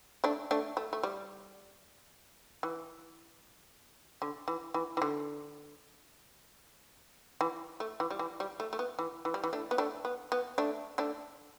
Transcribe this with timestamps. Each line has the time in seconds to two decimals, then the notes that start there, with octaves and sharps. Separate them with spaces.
0.24 A3 D4
0.51 A3 D4
0.77 A3
0.93 A3
1.03 G3
2.63 E3
4.22 D3
4.48 E3
4.74 E3
4.97 E3
5.02 D3
7.41 E3
7.80 A3
8.00 E3
8.11 G3
8.19 E3
8.40 G3
8.60 A3
8.73 A3
8.79 B3
8.99 E3
9.25 E3
9.34 G3
9.44 E3
9.53 A3 D4
9.71 B3
9.78 A3 D4
10.05 B3
10.32 B3
10.58 A3 D4
10.98 A3 D4